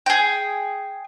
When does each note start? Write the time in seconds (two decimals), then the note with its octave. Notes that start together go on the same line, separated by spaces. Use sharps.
0.06 G#4 G5